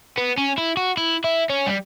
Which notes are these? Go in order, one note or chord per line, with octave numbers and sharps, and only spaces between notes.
B3
C#4
E4
F#4
E4
E4
C#4
G3